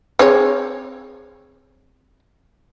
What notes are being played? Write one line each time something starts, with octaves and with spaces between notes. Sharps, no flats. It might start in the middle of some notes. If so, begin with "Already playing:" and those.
C4 G#4 C#5